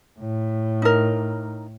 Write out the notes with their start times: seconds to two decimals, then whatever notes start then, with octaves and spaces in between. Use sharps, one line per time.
0.20 A2
0.82 D#4 A#4